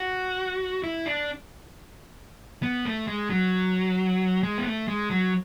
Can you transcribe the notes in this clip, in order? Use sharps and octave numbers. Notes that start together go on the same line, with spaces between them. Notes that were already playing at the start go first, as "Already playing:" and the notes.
Already playing: F#4
E4
D4
B3
A3
G#3
F#3
G#3
B3
A3
G#3
F#3